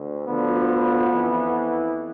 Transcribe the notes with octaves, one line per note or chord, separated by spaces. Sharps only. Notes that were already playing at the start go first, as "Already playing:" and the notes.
Already playing: D2
D2 D3 F3 B3
F2 E3